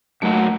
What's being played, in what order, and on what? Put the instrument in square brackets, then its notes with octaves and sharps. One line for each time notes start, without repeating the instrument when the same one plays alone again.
[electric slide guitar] F#2 F#3 A#3 D#4 F#4 [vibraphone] A3